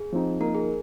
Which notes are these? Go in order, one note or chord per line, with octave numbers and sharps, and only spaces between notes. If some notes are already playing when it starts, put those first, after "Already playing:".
Already playing: G#4
F3 C4 D#4
F3 A#3 D#4 A#4
G#4